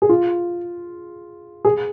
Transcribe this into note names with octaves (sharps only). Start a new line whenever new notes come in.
G#4
F4
G#4